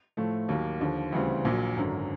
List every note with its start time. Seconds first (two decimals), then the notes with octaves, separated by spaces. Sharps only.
0.17 A2 F3 A3
0.49 D#2 D#3 F#3 A#3
0.81 D#2 D3 F3
1.12 D2 C#3 E3 G3 C4
1.45 A#1 A#2 F#3
1.76 G#1 F#2 D3